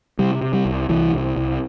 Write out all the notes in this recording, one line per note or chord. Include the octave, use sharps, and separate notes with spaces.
C3 G3
C3
G3
C2
C2 E3
C2
C2